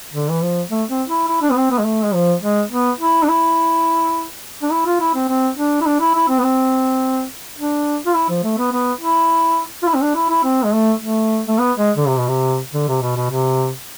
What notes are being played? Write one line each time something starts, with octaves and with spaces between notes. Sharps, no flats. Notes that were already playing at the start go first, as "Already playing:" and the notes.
D3
E3
F3
A3
C4
E4
E4
D4
B3
C4
B3
G#3
A3
G#3
F3
G#3
B3
E4
D4
E4
D4
E4
F4
E4
C4
C4
D4
E4
D4
E4
E4
C4
B3
C4
D4
F4
E4
F3
A3
B3
B3
E4
F4
E4
C4
D4
E4
E4
C4
G#3
A3
A3
A3
B3
G#3
D3
C3
B2
C3
D3
C3
B2
B2
C3